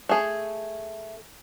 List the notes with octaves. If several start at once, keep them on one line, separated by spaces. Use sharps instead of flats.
A3 G#4